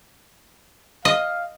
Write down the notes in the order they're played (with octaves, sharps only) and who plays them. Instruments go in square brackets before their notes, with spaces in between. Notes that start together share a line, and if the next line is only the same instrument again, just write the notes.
[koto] D#5 [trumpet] F5